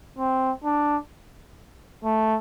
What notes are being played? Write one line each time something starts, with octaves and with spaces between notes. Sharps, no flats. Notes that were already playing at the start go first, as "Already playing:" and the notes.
C4
D4
A3